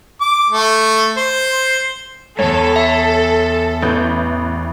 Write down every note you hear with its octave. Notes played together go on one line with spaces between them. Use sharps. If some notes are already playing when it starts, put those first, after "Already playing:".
D6
A3
C5
E2 G#2 A4 C#5
E5
A1 B3 G6